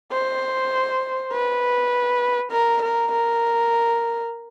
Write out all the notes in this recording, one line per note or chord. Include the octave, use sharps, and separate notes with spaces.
C5
B4
A#4
A#4
A#4